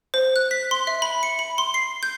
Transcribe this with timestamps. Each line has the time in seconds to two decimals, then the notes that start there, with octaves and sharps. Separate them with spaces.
0.14 C5
0.36 F#6
0.51 B6
0.71 C6
0.87 E5
1.02 B5
1.23 C#7
1.39 B5
1.58 C6
1.74 C7
2.03 G6